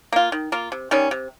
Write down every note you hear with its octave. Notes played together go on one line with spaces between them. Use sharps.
A#3 F4
D#3
A#3 F4
C3
D#3 G3 C#4
C3